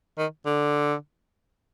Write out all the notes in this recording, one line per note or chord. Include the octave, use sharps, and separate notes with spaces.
D#3
D3